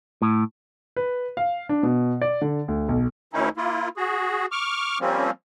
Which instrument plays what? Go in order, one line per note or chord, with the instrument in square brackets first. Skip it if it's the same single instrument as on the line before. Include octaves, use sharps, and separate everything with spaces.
[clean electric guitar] A2
[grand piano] B4
F5
D4
B2
D5
D3
D2
B1
[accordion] D2 D#3 C#4 D#4 E4
A#3 E4 F4
F#4 G#4
C#6 D6 F6
F3 G3 A#3 C4 C#4